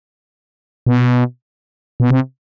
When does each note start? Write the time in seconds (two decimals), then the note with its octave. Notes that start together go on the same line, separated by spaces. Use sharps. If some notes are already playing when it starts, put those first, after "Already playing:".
0.87 B2
2.00 B2
2.11 C3